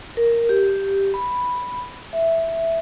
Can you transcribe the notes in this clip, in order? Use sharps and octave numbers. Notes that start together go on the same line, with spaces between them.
A#4
G4
B5
E5